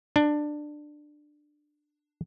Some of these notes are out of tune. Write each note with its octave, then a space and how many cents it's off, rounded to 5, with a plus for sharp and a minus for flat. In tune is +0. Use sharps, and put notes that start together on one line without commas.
D4 +15